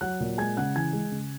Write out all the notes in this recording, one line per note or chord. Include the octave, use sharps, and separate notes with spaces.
F#3 F#5 F#6
A#2
G#3 G#5 G#6
C#3 F#5 F#6
E3 G#5 G#6
G#3
C#3